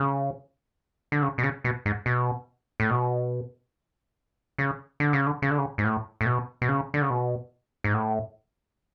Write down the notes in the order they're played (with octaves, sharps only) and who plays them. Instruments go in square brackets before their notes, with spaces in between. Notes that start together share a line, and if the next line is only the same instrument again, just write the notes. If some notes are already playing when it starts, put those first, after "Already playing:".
Already playing: [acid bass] C#3
D3
C#3
B2
C#3
B2
G#2
B2
A2
B2
C#3
D3
C#3
D3
C#3
D3
C#3
G#2
A2
A2
B2
B2
C#3
D3
C#3
B2
G#2
A2